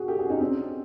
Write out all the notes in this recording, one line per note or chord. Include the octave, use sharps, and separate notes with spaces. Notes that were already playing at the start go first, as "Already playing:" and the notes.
Already playing: F#4 G#4
G4 A4
F#4 G#4
C#4 D#4
C4 D4